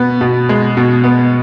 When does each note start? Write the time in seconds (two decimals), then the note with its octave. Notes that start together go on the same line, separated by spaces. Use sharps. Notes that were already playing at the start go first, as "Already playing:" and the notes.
Already playing: B2 B3
0.21 B2
0.49 G#3
0.77 B2
1.04 B3